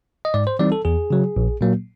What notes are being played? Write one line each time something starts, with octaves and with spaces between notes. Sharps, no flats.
D#5
G#2 D5
C5
E3 G3 C4 D#4 D5
A4
E2 G#4
C#3 F#3
A#1
A#2 F#3 A#3